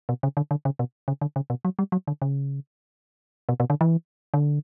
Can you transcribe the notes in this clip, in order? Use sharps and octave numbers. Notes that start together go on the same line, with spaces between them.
B2
C#3
D3
D3
C#3
B2
C#3
D3
C#3
B2
F#3
G3
F#3
D3
C#3
B2
B2
D3
E3
D3